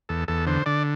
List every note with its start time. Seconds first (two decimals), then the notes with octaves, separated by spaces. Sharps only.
0.09 E2 A4
0.28 E2 A4
0.47 D3 C5
0.66 D3 D5